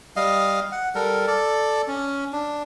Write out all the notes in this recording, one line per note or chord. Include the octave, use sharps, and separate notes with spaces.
G3 D#5 F5
F#5
G3 A4 A#4
A4 D5
C#4
D4